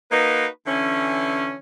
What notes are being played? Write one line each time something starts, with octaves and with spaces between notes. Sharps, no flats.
A#3 D#4 F#4 B4
D3 E3 C#4